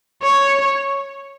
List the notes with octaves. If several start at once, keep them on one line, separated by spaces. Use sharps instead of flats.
C#5